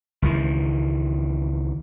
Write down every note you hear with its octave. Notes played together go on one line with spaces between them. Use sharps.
C#2 D#3 E3